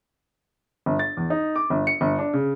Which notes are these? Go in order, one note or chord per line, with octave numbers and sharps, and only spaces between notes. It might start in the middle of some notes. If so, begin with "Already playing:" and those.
G1
A6
E2
D#4
D6
G1
C#7
G1
D4
C#3